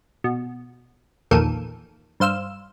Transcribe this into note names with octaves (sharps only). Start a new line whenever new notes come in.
B2
A#1 E2 D#3 A#3 A4 D#7
G2 C5 F5 E6